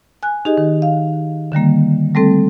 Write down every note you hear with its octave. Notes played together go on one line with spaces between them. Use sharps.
G#5 F#6
D#4 G4 G#4 D#5
D#3
F5
D3 D#3 G3 A#3
G3 A3 C4 A4